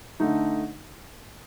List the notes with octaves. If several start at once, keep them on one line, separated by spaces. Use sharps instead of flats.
D3 A3 D#4